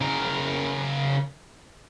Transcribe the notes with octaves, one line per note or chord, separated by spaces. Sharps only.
C#3 A#4